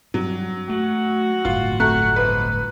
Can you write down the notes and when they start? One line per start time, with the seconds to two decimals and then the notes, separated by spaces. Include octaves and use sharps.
0.14 G2 F#3
0.69 A3 F#4
1.45 D1 G1 D2 F4
1.80 A3 F#4 A#5 F#6
2.16 G#2 F3 B4